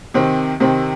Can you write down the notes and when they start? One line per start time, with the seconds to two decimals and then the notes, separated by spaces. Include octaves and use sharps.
0.14 C3 D#3 C4
0.60 C3 D#3 C4